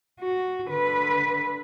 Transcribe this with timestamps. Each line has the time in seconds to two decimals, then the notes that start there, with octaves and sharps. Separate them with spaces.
0.20 F#4
0.69 D3 B4